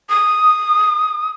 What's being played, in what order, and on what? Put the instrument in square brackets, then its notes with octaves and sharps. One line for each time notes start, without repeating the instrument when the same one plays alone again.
[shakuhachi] D#6